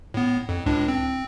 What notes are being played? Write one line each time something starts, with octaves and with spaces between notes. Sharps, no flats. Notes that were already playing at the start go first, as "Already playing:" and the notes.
A2 B3
F2
C#2 A2 D4
C4